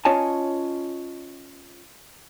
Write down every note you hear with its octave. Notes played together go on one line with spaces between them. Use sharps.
C#4 F4 C#5 D#5 G#5 A5